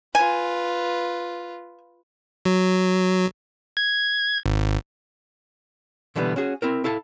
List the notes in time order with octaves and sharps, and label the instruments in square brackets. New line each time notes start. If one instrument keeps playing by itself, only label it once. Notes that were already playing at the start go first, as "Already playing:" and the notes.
[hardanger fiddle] F4 B4 [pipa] G#5
[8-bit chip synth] F#3
G#6
G#1
[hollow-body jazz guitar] B2 D3 E3 G3 B3
C#4 F#4 G#4
C4 E4 A#4
E4 A4 F5 A5